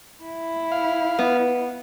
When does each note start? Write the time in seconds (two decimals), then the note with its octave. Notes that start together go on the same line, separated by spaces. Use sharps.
0.23 E4
0.72 F5
1.19 B3